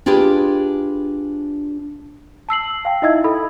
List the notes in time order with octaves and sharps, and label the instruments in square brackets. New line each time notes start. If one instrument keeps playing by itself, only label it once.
[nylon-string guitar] D4 F4 G4 G#4 B4
[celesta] A5 E6 C7 F#7
F5 G5
D#4 E4 D#5 E5 E6 G#6
A4 B5